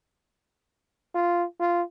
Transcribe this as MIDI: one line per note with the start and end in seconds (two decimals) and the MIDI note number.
1.15 1.45 65
1.60 1.82 65